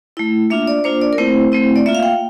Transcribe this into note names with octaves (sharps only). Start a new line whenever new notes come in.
A3 E4
A#3 D4 F4 E5
D5
A#3 D4 F4 C5
D5
A#4
A3 C4 E4 C5
A3 C4 E4
D5
A#3 F4 E5
F5
G5